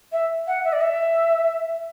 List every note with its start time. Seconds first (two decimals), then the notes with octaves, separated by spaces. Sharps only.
0.12 E5
0.47 F#5
0.64 E5
0.73 D5
0.81 E5